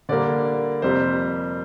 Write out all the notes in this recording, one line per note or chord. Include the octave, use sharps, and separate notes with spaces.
D3 G3 A#3 D5
F2 C3 G3 A#3 C5